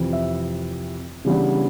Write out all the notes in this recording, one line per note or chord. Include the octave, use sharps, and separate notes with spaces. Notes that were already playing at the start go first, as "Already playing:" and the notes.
Already playing: F2 C3 E3
E5
C#3 E3 G3 B3 D4